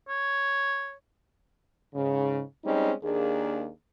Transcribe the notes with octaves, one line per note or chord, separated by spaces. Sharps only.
C#5
G#2 C#3
G3 G#3 C4 C#4 D#4
D#2 A#3 D4 G#4